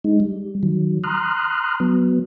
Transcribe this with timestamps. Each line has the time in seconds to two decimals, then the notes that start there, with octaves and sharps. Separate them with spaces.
0.04 G#3 D#4
0.20 G3
0.63 D#3 F#3
1.04 A#5 C6 D#6 F6 F#6
1.80 F#3 B3